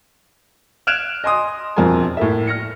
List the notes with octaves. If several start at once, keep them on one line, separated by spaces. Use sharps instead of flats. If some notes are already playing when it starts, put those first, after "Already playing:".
F6 F#6 G#6 D7 E7 F7
D#5 G#5 C6 D#6
E1 F2 C4 A#4 G#5
A2 A#3 E5
F6 A#6 C#7